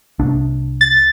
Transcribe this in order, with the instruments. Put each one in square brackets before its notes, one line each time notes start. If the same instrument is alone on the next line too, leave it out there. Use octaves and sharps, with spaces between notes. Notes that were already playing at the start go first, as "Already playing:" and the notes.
[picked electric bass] C2 D4
[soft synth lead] A6